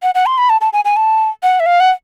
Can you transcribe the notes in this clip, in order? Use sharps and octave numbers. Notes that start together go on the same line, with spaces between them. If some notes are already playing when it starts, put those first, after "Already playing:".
F#5
F#5
C6
B5
A5
A5
G#5
G#5
A5
F#5
E5
F5
F#5